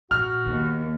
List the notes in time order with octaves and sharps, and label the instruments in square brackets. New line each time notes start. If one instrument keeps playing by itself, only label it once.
[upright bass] A#2 [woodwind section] F#4 [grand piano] F6
[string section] D#2 [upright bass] B3